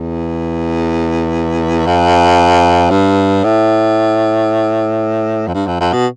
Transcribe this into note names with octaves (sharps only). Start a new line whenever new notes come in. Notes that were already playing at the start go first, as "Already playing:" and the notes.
Already playing: E2
F2
G2
A2
F2
G2
F2
F2
B2